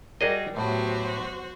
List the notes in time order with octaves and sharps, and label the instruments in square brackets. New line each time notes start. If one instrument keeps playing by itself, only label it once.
[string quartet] G3 [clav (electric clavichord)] F#4 G#4 D#5 [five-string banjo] A#4 D5
[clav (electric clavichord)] A2 [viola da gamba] F#3 B3 G4 [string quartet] F#4 C5